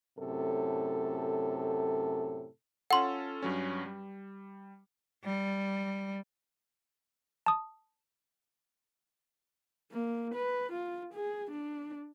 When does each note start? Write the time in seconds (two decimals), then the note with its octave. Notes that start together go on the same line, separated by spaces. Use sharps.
0.19 F#2 A2 C3 A4
2.91 C#4 F4 A4 F#5 C6
3.42 G2 F#3 C#4
3.86 G3
5.24 G3
7.46 A5 D#6
9.92 A#3
10.35 B4
10.72 F4
11.14 G#4
11.51 D4